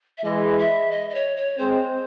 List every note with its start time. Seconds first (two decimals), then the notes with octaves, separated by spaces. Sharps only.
0.18 E5
0.24 E3 G#3 D#5
0.59 E5
0.91 D#5
1.10 D#5
1.15 C#5
1.37 C#5
1.58 G#3 C4 C5